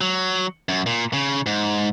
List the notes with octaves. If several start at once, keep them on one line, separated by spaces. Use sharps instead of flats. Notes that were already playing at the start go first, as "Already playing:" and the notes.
F#3
F#2
A#2
C#3
G#2